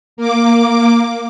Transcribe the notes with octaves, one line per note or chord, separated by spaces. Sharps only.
A#3 D6